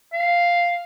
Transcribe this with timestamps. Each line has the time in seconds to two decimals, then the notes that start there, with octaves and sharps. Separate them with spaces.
0.13 F5